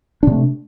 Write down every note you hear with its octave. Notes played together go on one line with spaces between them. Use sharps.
C3 A3 D4